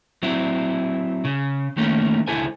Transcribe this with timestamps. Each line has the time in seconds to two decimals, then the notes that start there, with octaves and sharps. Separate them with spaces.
0.23 F#3 C4 E4
1.25 C#3
1.77 D#3 A3 A#3 C#4
2.27 C#2 D3 E4 A4 C5 G#5